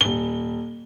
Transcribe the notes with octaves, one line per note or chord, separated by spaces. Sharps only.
D#1 G7